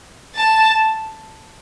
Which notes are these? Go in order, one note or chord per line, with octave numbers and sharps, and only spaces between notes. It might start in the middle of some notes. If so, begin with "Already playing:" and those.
A5